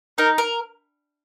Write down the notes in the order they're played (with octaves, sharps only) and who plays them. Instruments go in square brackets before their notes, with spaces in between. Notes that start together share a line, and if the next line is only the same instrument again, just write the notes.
[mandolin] D#4 [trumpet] A#4
[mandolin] A#4